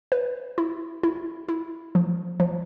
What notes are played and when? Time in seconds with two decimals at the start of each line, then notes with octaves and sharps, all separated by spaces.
0.12 B4
0.58 E4
1.03 E4
1.49 E4
1.95 F3
2.40 F3